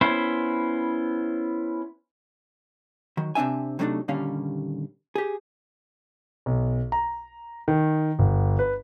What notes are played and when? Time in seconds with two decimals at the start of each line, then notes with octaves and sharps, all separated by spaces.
0.01 B3 C#4 E4 C5
3.17 D#3 F#3
3.35 C3 C4 D4 E5 G#5
3.79 C3 F#3 A3 A#3 D4 D#4
4.08 D#2 A#2 D3 G3 C#4 F5
5.15 G4 G#4
6.46 B1
6.92 A#5
7.68 D#3
8.19 G1
8.59 B4